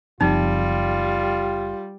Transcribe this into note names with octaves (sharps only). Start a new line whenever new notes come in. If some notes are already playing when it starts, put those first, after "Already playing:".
F#1 F3 G3 C4 D#4 F4